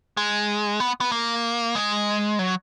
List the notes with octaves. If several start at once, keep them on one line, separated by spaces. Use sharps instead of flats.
G#3
B3
B3
A#3
G#3
F#3